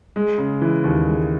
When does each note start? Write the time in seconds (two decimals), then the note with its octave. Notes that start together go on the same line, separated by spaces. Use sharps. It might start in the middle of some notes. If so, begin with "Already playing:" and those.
0.16 G#3
0.38 C#3
0.62 E3
0.84 D#2
1.06 G#3